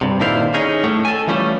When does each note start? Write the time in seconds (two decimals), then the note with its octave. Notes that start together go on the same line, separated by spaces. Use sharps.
0.01 G2 C3
0.20 A#2 D3 D#3 E4 C5 F5
0.54 C#4 D#4 G#4
0.84 A2 A3 C#4
1.05 A4 G#5
1.27 E3 F3 G3 A3 C#4